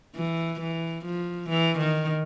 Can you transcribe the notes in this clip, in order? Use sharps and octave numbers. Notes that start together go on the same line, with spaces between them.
E3
E3
F3
E3
D#3